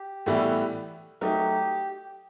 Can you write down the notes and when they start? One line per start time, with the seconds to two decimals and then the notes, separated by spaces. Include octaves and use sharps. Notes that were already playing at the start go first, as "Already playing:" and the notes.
Already playing: G4
0.26 A2 E3 G3 B3 E4
1.21 F#3 A3 D#4 G4